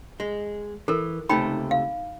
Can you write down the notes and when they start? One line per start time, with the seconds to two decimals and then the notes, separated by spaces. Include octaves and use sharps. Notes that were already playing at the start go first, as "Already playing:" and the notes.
0.20 G#3
0.88 E3 A4 A#4
1.29 C#2 C3 A3 D#4 G5 B5
1.71 F5